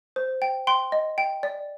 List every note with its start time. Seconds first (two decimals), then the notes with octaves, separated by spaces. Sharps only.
0.16 C5
0.42 G5
0.67 G5 C6
0.92 D#5
1.18 G5
1.43 D5